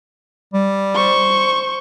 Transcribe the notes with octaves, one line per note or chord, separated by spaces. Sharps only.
G3
C5 C#6